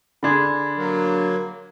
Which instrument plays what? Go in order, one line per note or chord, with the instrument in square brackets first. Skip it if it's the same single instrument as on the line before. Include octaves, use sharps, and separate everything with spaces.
[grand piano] D3 D4 G#4 [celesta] B5 C6 G#6
[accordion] F#3 A#3